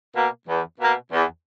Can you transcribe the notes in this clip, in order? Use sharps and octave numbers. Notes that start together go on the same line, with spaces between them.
B2 A#3
E2
B2 A#3
E2